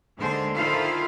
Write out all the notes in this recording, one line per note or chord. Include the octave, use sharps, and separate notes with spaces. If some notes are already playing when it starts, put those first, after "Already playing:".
D#2 D3 G#3 C5
D#3 E4 F4 A4 C5 F5